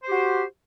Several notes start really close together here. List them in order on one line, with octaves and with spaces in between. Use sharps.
C5 G4 F#4